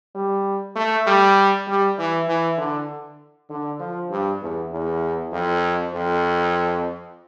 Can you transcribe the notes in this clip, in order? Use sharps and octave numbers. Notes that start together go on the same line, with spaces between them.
G3
A3
G3
G3
E3
E3
D3
D3
F3
G2
E2
E2
F2
F2